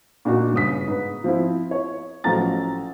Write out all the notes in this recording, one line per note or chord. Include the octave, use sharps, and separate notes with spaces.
A#2 D4 D#4 F#4
G1 C#3 D#6 B6
G#2 B4
F3 C4 E4
C#5
A1 F3 F#3 A4 A#5 A6